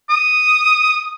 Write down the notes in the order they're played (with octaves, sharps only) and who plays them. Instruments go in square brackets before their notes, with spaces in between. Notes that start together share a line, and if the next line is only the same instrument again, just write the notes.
[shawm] D#6